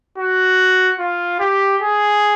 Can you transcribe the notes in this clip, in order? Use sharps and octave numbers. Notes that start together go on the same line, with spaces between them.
F#4
F4
G4
G#4